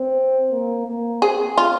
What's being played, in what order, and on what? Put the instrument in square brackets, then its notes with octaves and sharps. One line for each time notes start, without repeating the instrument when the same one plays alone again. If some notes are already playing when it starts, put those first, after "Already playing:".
Already playing: [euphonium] C4
A#3
A#3
[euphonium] C4 [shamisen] G#4
[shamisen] F4